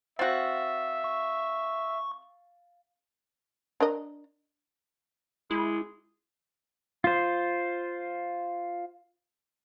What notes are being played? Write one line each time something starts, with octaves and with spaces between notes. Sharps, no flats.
C4 F#4 E5 F5 A6
C#6
D4 A#4 D#5
G#3 E4
F4 C5